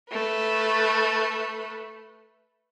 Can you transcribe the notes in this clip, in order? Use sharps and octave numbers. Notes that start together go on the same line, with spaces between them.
A3 B4